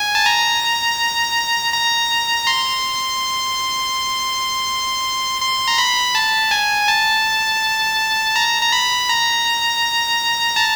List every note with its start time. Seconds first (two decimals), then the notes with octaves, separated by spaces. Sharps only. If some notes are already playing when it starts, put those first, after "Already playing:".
Already playing: G#5
0.15 A5
0.26 A#5
1.73 A#5
2.47 C6
5.42 C6
5.68 A#5
5.78 B5
6.15 A5
6.51 G#5
6.88 A5
8.36 A#5
8.62 A#5
8.72 B5
9.09 A#5
10.56 A5